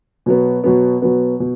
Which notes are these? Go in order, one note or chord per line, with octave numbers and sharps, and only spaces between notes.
B2 F#3 B3
B2 F#3 B3
B2 F#3 B3
B2